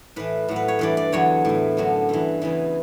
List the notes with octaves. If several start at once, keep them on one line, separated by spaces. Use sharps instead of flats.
A2 E3 B4
A2 F#3
B4
C#5
G2 E3 D5
D5
E2 D3 F#3 C#5
A2 E3
F#2 D3 F#3
G2 E3
E2 C#3 E3